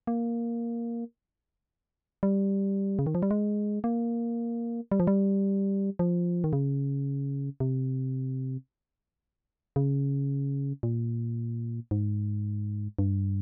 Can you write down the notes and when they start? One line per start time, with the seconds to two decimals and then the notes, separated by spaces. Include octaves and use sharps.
0.07 A#3
2.23 G3
2.99 C#3
3.06 D#3
3.15 F3
3.23 G3
3.31 G#3
3.84 A#3
4.92 G3
5.00 F3
5.07 G3
5.99 F3
6.44 D#3
6.53 C#3
7.60 C3
9.76 C#3
10.83 A#2
11.91 G#2
12.99 G2